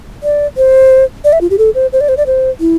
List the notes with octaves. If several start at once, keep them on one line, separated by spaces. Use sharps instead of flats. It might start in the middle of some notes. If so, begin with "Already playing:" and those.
D5
C5
D5
E5
F4
G4
A4
C5
C5
D5
C5
D5
C5
E4